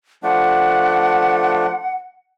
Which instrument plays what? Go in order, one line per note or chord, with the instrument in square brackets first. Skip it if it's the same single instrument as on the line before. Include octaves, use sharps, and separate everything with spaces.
[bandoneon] F3 A3 D4 [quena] F#5